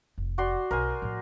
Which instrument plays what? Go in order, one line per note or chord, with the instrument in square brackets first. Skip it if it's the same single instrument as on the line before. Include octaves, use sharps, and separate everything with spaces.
[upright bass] F1
[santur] F#4 D5 C6
[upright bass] B1 [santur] A#4 C5 G#5
[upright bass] A2 F3